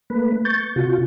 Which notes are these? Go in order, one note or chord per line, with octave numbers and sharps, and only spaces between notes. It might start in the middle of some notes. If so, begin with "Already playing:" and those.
A3 A#3 B4
C#6 G6 A6
C3 F4 F#4